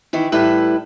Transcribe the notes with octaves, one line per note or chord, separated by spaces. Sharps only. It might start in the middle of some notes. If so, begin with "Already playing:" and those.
D#3 E3 E4
A2 G3 E4 B4